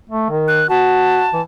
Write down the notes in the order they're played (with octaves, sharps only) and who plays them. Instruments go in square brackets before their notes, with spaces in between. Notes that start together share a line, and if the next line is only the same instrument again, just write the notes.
[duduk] A3
D#3
[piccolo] F#6
[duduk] F#4 [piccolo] A5
[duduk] E3